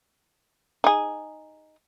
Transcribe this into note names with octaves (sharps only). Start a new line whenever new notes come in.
D#4 G#4